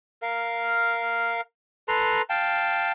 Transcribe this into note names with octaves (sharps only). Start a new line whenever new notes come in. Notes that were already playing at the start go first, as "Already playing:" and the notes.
A#4 F5
A4 B4 A#5 C6
F5 G5 A5